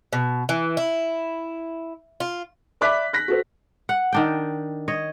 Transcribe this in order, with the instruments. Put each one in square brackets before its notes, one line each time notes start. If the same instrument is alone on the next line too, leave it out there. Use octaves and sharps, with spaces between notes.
[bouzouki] B2
E3
E4
F4
[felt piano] D5 E5 B5 D6 F#6 B6
F#6 A#6 B6
F#4 A4 C5
[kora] F#5
D#3 D4 G5
C#5 D#5